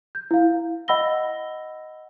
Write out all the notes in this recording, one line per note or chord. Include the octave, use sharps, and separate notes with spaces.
G6
E4 F5
D#5 F#5 B5 E6 A#6 G7